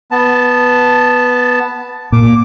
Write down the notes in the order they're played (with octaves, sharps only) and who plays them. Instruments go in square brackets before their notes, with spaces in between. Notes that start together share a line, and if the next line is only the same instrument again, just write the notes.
[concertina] B3 A5
[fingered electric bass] A#2 [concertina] D6